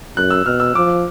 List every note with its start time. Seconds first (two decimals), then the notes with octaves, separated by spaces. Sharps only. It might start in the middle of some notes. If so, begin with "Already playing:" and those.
0.16 F#2 F#6
0.30 E6
0.46 B2 F6
0.60 E6
0.75 F3 D6